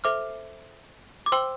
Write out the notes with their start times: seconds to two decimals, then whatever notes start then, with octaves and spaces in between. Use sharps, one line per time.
0.04 A4 C5 E5 D6 F6
1.26 D6
1.32 C5 G5 C6 E6